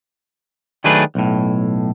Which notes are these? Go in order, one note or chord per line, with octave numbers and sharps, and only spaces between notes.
D#3 F#3 A3 D4 G#4 B4
B1 A2